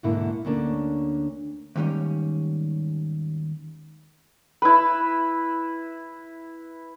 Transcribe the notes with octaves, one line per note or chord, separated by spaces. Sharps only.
D2 G#2 B2 D3 A#3 E4
D2 D3 A#3 C#4 D4
D#2 G#2 D#3 G3 C#4
E4 B4